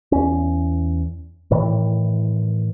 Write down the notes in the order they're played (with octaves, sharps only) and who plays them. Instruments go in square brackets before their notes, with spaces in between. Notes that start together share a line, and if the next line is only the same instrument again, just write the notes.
[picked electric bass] E2 C#4
A2 D#3 E3